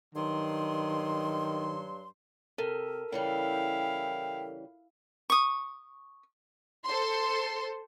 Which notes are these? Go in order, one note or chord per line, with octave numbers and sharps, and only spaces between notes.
G2 D#3 F#3 C6
C3 A4 A#4
C#3 E3 G3 E4 F5 G5
C#6 D#6
A4 C5 C6